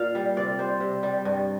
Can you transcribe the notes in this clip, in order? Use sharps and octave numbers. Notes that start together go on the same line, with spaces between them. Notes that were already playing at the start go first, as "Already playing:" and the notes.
Already playing: A#2 D5 F5
G3
C3 D5
G3 C5
C3
G3
G2